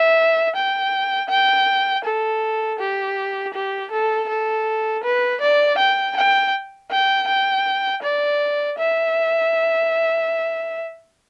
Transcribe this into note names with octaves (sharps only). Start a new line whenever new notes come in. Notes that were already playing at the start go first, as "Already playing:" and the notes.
Already playing: E5
G5
G5
A4
G4
G4
A4
A4
B4
D5
G5
G5
G5
G5
D5
E5